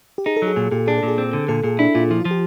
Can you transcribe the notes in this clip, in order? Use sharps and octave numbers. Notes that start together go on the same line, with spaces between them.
G4
D#4 G#4
A4
F#3 G#4
A#2 G#4
A#2 G4
D4 G#4
A4
A#2 G#4
C4
D3
A#2 A4
A#2 G#4
D4 E4
A#2 F4
F3 E4
F4
F3
G4